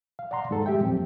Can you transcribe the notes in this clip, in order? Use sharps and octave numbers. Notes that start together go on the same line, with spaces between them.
F5
D5 F#5 A#5 C6
G#2 A4
G#3 G4 E5 G5
F2 A#2 F#3 C4